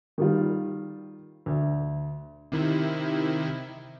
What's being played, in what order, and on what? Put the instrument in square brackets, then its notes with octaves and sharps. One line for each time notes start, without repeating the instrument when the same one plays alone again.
[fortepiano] D#3 G3 F4
D2
[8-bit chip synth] C3 D#3 E4